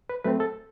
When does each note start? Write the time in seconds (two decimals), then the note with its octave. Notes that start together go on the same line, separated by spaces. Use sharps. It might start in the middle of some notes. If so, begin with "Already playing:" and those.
0.09 B4
0.24 F#3 A3 C4 B4
0.40 A4